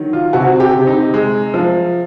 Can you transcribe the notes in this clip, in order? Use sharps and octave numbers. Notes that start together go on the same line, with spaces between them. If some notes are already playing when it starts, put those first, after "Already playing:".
Already playing: D#3 F#3
F4
C3 F#4
G4
C3
D#4
G#3
F3